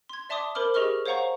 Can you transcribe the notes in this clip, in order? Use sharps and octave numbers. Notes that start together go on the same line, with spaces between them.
C6 G#6
D5 E5 A5 C6 D6 D#6
A#4 C5 B5 D6 F6
G4 G#4 D#5 C#6 F6 G7
C5 C#5 F5 F#5 A#5 C#6